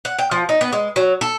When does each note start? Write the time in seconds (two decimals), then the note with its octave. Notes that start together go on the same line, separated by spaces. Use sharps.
0.05 F#5
0.19 G5
0.31 F3
0.49 D#4
0.61 B3
0.73 G#3
0.96 F#3
1.21 A4